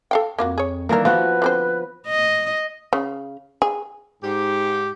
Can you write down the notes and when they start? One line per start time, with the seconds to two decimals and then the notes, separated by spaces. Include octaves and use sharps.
0.11 A4 F5 G5
0.39 F2 A#3 F4 F#4
0.58 G#4 C#5
0.89 D#3 E3 G3 A#3 B3 A#4
1.05 F3 B3 F4 F#4 B4
1.42 D3 C4 C5
2.07 D#5
2.93 C#3
3.62 G#4
4.22 G#2 G4